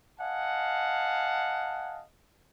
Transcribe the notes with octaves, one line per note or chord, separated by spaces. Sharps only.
D#5 F5 F#5 G#5 A5